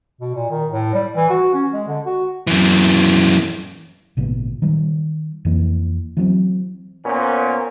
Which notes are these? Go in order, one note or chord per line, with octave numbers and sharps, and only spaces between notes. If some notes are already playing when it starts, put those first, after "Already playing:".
B2
A#2
D#3
A2
G3
E3
F#4
C#4
G#3
D3
F#4
F#2 E3
G#1 A#2 C#3 B3
D#3 G3
F2 E3 A#3
E3 F#3 A3 C4
A#2 B3 C#4 C5